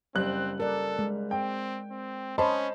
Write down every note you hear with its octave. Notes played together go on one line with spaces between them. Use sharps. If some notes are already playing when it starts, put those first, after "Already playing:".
F#1 G3 C4 F#6
A4 A#4 D5
G#3
C4 G5
C4
C#4 C5 D#5 A5 B5 C6